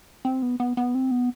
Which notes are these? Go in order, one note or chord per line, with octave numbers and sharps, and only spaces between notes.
C4
B3
B3
B3
C4
B3